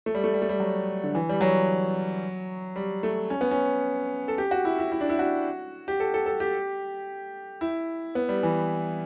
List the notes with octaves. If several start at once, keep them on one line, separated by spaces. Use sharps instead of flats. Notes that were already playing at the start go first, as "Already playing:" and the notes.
A3
G3
A3
G3
A3
G3
F#3
D3
E3
G3
F#3
G3
A3
C#4
B3
C#4
A4
G4
F#4
E4
E4
E4
D4
E4
F#4
G4
A4
A4
A4
G4
E4
B3
G3
E3